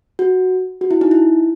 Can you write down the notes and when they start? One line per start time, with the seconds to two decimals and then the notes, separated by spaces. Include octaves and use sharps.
0.19 F#4
0.81 F#4
0.91 E4
1.01 D#4
1.11 E4